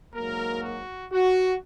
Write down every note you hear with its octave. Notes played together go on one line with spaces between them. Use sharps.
G#2 F#3 A#3 A#4
F#4
F#4